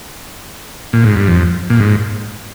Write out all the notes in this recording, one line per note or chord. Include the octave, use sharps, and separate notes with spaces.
A#2
G#2
G2
F2
A#2
G#2